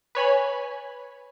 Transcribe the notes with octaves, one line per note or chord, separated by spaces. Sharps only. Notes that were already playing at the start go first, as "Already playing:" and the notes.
B4 C#5 G#5 B5